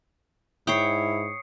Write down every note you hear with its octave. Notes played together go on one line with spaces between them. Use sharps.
G#2 E4 C#5 G5 D#6 C7 C#7